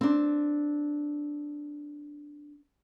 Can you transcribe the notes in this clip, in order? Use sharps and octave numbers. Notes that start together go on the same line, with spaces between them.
C4 D4